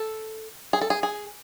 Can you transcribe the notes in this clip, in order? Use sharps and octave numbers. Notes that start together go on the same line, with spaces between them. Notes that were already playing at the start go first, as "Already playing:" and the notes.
Already playing: A4
G#4
A4
G#4
G#4